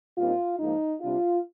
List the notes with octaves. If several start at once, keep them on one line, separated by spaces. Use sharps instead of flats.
A#2 G3 C4 D#4 F4
G#2 F3 A#3 D#4
C3 G3 D4 F4